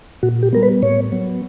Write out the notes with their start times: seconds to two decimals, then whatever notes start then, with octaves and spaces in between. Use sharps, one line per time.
0.23 A#2 F#4
0.43 G4
0.53 G3 B3 A#4
0.63 B4
0.83 A2 C#5
1.12 F#3 B3